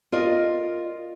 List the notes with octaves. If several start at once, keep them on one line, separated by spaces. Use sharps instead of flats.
F4 A#4 D5 D#5